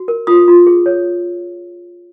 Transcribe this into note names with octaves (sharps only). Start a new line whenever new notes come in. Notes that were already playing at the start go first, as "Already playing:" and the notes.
Already playing: F#4
A#4
F4 D#6
F4
G#4
C#5